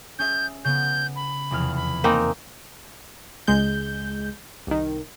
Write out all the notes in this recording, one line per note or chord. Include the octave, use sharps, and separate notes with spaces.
C#4 G#4 E5 G6
C#3 B3 G6
B5
F1 E2 F6
B5
A#3 C4 D#4 G#5
C#2 G#3 G6
C2 D#3